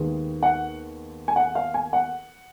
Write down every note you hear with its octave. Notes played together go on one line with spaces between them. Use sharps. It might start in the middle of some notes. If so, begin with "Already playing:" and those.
Already playing: D#2 D#3 G#3 B3
F#5
G#5
F#5
F5
G#5
F#5